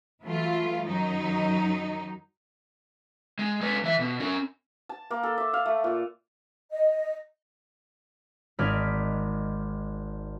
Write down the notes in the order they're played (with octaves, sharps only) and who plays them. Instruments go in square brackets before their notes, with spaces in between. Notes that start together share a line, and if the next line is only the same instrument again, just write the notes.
[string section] E3 F#3 A3 F4
F#2 D#3 F#3 D#4
[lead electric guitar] G#3
G#3 B4
E3 E5
B2
C#4 A#4
[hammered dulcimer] A5
A#3
A4
E5
F5
A3
A#2
[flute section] D#5
[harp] G#1 D5 D#5 F6 G#6 B6